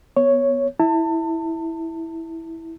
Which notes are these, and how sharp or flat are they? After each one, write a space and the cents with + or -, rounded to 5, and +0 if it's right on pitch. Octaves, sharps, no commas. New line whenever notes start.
B3 +0 C#5 +0
E4 -10 A5 +30